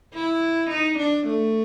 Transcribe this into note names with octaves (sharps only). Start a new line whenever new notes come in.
E4
D#4
D4
A3